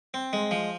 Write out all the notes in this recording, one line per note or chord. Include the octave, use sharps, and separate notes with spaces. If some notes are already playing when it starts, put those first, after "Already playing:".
C4
G#3
F3